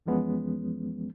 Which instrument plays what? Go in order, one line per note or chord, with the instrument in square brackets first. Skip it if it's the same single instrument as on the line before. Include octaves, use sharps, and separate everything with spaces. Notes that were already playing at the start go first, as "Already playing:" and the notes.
[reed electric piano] F2 E3 F3 G#3 B3 C#4